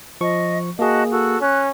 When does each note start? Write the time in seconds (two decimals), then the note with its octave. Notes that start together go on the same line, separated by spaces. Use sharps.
0.21 F3 D#5 C#6
0.79 A#3 F#4 G#4 D#5 A5
1.11 F#4 A4 E6
1.41 C#4 F#6